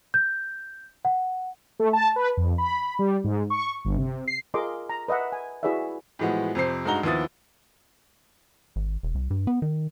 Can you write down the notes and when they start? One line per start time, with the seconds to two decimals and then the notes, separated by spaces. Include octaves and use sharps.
0.14 G6
1.05 F#5
1.79 A3
1.93 A5
2.16 B4
2.37 F2
2.58 B5
2.99 G3
3.24 G#2
3.50 C#6
3.85 G1
3.97 C3
4.28 C7
4.54 F4 G#4 A#4 D#5 C6 D6
4.89 A#5
5.08 B4 D#5 E5 F#5
5.32 G#5
5.63 E4 F#4 G#4 B4 D5 E5
6.19 A2 E3 F3 G#3 B3 F#4
6.55 F2 C3 C5 C7
6.85 G2 G#3 D#4 F#4 A#5 G7
7.03 D#2 F3 B3 E4 D#6 A6
8.76 G#1
9.03 E1
9.15 C2
9.30 G2
9.47 B3
9.62 D#3